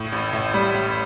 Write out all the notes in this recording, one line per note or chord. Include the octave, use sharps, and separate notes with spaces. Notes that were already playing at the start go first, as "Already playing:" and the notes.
Already playing: A2
A1
A2
G3
A1